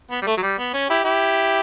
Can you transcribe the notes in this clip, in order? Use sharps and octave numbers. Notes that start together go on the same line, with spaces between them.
B3
G3
A3
F#3
G3
B3
C#4
E4 G4
E4 G4